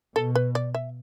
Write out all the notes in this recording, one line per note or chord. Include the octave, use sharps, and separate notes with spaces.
B2 A4
B4
D5
E5